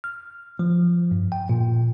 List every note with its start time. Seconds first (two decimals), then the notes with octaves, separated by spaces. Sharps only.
0.04 F6
0.59 F3
1.11 G2
1.32 G5
1.49 A#2